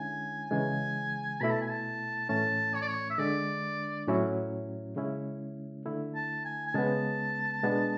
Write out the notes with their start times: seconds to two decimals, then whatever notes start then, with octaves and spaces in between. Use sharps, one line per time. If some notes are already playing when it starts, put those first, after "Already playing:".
Already playing: D3 G#3 C#4 E4 G#5
0.51 C#3 E3 G#3 G#5
1.41 B2 A3 E4 B5
1.50 A5
1.61 G#5
1.70 A5
2.29 A2 E3 A3 C#4 A5
2.75 C#5
2.81 D5
2.88 C#5
3.10 E5
3.18 D3 G#3 D4 D5
4.08 A2 F#3 C#4 E4
4.96 C#3 G#3 C#4 E4
5.86 D3 A3 E4
6.15 A5
6.45 G#5
6.66 G#5
6.74 C#3 G#3 B3 A5
7.63 B2 G#3 B3 D4